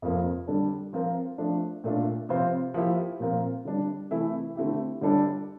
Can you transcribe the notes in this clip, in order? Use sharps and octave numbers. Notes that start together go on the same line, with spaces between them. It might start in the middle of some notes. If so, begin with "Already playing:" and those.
F2 C3 F3 A#3
D3 G3 D4 A4
F3 C4 F4 A#4
F3 A3 D4
A#2 A3 D4 F4
C3 F3 C4 F4 C5
F3 A#3 E4 G4
A#2 F3 C4 F4 A#4
D3 G3 D4
C3 E3 A3 E4
D3 A3 C4 E4 G4
D3 G3 D4 A4 D5